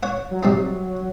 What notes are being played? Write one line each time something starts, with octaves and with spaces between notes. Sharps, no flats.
C#5 F#5
F#3
C3 G3 D#4